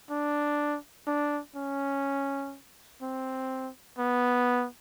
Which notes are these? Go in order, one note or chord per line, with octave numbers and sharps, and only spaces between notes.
D4
D4
C#4
C4
B3